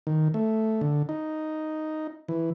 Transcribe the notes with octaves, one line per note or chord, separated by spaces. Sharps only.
D#3
A3
D3
D#4
E3